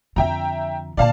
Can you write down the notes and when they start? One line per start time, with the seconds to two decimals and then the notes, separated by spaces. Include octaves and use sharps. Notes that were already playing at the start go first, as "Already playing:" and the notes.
0.16 F2 D3 E5 G5 A#5
0.97 A#2 D3 D5 F5 A5